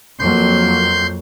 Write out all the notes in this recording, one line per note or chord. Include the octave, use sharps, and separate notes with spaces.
F2 F#3 A#3 C6 G6